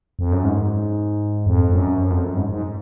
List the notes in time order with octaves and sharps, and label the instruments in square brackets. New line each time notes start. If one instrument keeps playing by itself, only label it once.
[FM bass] F2
F#2
G#2
F2
F#2
F#2
F2
F#2
G#2
G#2